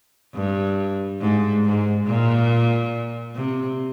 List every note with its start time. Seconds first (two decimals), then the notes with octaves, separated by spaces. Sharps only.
0.34 G2
1.21 G#2
1.64 G#2
2.06 A#2
3.35 C3